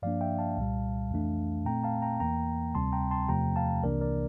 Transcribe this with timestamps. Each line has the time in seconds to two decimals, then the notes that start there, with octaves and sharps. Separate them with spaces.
0.02 G2 F3 A#3 D4 D5 F5
0.21 E5 G5
0.39 F5 A5
0.57 C2 A#2 G3
1.11 F2 E3 A3 D4
1.65 A#2 A3 C4 G5 A#5
1.84 F5 A5
2.02 G5 A#5
2.20 E2 E3 A#3 G5 A#5
2.75 D2 C3 G3 C4 A5 C6
2.93 G5 A#5
3.11 A5 C6
3.29 E2 C3 F3 A3 G5 A#5
3.56 F5 A5
3.83 C2 C3 E3 A#3 D4 A#4 D5
4.01 A#4 D5